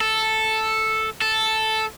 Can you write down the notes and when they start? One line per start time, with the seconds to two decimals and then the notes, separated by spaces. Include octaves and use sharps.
0.01 A4
1.22 A4